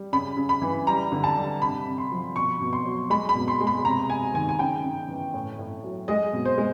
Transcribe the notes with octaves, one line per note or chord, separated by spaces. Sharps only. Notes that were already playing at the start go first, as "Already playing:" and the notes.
Already playing: G3
C#3 B5
C#3
B5
E3
G3 A#5
D3
A5
G3
C3 B5
C3
C6
F3
B2 C#6
B2
C6
F#3
G#3 B5
B5
B2
C6
G#3
B5
C3 A#5
C3 G#5
D#3 G#5
G#5
C#3 G5
C#3
E3
A2
A2
F#3
G#3 D#5
B2
C5
G#3